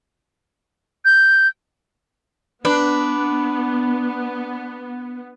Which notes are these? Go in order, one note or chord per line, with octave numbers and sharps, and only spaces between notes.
G6
B3 D4 B4